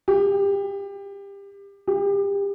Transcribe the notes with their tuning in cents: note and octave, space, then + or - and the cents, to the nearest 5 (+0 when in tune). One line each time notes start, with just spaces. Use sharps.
G4 +25
G4 +30